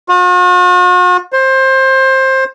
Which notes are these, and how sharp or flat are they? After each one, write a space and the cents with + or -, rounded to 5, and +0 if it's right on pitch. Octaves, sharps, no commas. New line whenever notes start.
F#4 -45
C5 +20